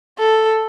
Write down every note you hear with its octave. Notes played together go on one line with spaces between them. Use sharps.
A4